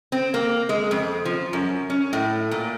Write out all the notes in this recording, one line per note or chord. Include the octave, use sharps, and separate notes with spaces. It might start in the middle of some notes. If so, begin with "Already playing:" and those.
C4
A#3
G#3
F2
F3
F#2
C#4
A2
A#2